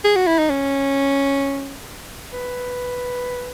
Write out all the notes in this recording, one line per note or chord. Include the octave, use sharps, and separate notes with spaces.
G#4
F#4
E4
D#4
C#4
B4